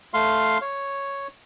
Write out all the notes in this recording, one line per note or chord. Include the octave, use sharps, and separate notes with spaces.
A3 F5 C6
C#5